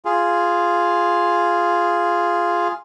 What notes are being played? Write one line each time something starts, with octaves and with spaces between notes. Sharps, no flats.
F4 G#4